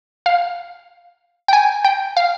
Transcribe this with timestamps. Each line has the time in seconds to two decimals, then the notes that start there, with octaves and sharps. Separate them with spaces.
0.26 F5
1.48 G5
1.53 G#5
1.84 G5
2.17 F5